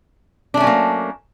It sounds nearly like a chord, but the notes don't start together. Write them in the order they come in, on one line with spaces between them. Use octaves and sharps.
D4 A3 C#4 F#3 A#3